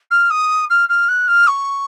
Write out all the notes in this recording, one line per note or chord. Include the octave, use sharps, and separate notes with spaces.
F6
D#6
F6
F6
F#6
F6
C#6